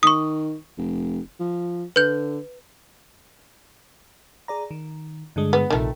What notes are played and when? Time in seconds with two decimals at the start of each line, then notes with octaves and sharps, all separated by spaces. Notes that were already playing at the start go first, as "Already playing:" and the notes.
0.03 D#3 C#6 D#6
0.78 F1
1.40 F3
1.96 D3 B4 G6
4.48 G#4 D5 A#5
4.71 D#3
5.36 G2 D3 G#3
5.53 B3
5.70 A#1 C3 D#3 A3